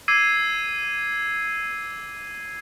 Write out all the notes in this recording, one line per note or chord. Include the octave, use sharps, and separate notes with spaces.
D6 E6 G#6 C7 D#7